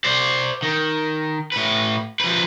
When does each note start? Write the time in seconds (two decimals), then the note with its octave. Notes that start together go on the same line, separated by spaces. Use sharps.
0.04 C5 D5
0.62 D#3
1.52 A2 B4
2.20 F3 B4